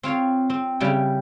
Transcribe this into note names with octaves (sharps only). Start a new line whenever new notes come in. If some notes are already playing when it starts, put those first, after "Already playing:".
C4 F4 C#5 F5
C4
C#3 G3 E4 G5